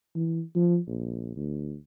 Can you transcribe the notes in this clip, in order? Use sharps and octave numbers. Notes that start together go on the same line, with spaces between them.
E3
F3
A#1
D2